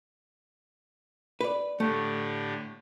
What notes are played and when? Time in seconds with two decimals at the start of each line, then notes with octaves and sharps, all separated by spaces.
1.41 B4 D5
1.80 A2 D3 A3 G4